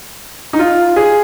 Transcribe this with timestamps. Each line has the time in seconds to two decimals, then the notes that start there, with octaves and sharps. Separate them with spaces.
0.53 D#4
0.59 F4
0.96 G#4